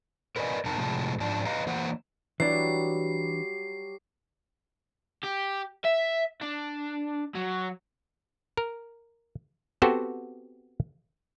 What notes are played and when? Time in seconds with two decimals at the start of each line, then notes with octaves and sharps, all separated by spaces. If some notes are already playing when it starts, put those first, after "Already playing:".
0.36 A#4 B4 D5 D#5 G#5
0.65 F2 C3 D#4 A#4 A5 A#5
0.77 A2 C3 F3 G#3 G#5 A5
1.20 G#2 F3 D4 A5
1.45 B4 D#5 F5 A#5
1.67 E3 A#3 C5 F#5
2.40 E3 F#3 G3 D4 G4 C7
5.24 G4
5.85 E5
6.42 D4
7.35 F#3
8.57 A#4
9.82 B3 C4 F#4 G4 A4 C5